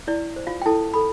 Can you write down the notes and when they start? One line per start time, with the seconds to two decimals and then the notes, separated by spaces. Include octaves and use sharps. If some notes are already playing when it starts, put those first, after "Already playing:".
0.07 E4 D5
0.36 C5
0.47 F4 F5
0.62 G5
0.66 E4 A4 A5
0.94 A4 B5